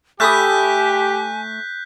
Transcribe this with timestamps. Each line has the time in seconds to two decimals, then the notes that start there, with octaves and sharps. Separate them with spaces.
0.20 A3 G4 G#5 B5 D#6 F#6 G6 B6